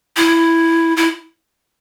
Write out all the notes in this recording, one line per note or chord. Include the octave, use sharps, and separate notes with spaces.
E4
E4